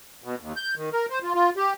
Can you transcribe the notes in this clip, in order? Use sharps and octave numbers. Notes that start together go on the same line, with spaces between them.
B2
D#2
G6
D#3
A#4
C5
F4
F4
G4